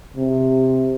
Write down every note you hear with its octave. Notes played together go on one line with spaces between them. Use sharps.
C3